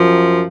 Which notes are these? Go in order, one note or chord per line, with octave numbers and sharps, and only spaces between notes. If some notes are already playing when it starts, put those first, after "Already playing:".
Already playing: F#2 F3